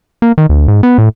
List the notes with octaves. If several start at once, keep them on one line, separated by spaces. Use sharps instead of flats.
A#3
D#3
D2
G#2
B3
A2